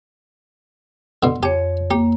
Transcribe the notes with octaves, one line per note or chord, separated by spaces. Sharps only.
B2 D3 C6
F2 G4 C#5
A#3 G4